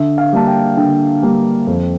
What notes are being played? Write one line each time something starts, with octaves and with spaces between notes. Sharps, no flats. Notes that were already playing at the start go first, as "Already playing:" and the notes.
Already playing: D3 E5
F5
G3 A#3 D4 A5
G5
D3 G5
G3 A#3 D4
F2